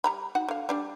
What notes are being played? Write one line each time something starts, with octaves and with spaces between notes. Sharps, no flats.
G3 A#5 B5
D#4 F#4 F#5
D3 F5
G3 D4 D5